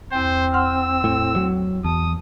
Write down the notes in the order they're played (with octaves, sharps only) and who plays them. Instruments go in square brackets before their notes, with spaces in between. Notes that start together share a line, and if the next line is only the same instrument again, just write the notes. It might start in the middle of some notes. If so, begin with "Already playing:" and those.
[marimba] E2 G5 [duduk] C4 [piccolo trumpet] C5
[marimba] F#5 C6 F6 [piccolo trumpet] E6
[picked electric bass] A2
F#3
[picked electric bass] E2 [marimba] A5 [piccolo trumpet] D#6